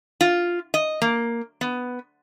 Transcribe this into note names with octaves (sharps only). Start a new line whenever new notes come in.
F4
D#5
A#3
B3